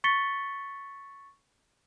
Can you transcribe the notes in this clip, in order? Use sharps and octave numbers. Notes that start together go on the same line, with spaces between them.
C#6 A6 B6 C#7 G7